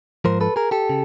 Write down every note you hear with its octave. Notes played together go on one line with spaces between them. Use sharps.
G#2 F3 A#4 C5
A4 B4
G#4 A#4
G4 A4
C#3